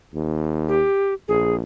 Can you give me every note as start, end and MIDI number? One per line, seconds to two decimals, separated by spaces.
0.14 0.84 39
0.68 1.14 67
1.28 1.62 34
1.28 1.56 68